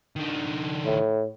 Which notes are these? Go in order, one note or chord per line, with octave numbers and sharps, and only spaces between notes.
D#3 D4
A2